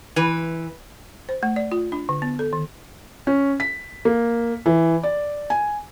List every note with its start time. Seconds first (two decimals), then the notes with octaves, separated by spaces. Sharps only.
0.16 E3 B4
1.29 C5
1.43 A3
1.56 D5
1.72 F4
1.92 D4
2.09 D3
2.22 B3
2.39 A4
2.53 D#3
3.27 C#4
3.60 B6
4.05 A#3
4.66 E3
5.03 D5
5.50 G#5